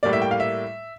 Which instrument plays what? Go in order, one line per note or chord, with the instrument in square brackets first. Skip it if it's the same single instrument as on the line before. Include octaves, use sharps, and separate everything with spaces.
[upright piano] A2 G3 A#3 D5
E5
G5
F5
E5